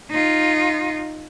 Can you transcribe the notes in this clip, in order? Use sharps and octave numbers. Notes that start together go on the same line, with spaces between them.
D#4 F4